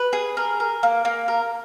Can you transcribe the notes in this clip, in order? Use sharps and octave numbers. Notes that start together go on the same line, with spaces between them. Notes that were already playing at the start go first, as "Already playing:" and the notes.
Already playing: B4
G#4
A#4
A#4
A#3
A#3
A#4